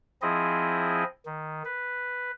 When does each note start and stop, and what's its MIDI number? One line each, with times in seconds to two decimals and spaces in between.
0.22 1.04 53
0.22 1.04 60
0.22 1.04 64
0.22 1.04 68
0.22 1.04 75
1.26 1.63 51
1.65 2.31 71